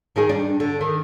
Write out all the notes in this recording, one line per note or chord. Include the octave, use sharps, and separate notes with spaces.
D#3 D#4 G#4
G2 D4
D3
D#3